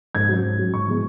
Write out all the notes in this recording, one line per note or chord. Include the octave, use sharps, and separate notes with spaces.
G#2 G#6
F#3 C#4
G#2
F#3 C#4
G#2 C#6
E3 G#3 B3